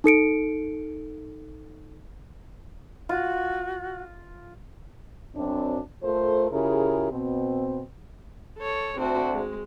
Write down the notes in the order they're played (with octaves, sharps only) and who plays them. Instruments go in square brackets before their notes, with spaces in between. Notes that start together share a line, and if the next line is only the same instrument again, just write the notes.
[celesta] D#4 A4 C#7 D7
[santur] F4 [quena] F#4
[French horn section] F#2 C4 D4
A3 F4 A4 A#4 C5
C#3 E4 F4 G4 G#4 A#4
B2 C4
[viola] A4 C#5
[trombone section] D2 D4 [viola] C4 F#4
[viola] G#3